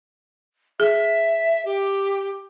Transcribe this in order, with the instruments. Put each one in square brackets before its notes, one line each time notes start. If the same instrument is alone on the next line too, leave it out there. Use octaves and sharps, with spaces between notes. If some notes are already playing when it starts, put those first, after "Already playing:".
[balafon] G#4 [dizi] E5
[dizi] G4